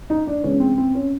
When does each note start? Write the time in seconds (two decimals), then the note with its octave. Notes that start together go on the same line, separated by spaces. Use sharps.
0.10 D#4
0.27 D4
0.43 C#3 E3 G#3 B3 C#4
0.60 C4
0.78 C4
0.95 C#4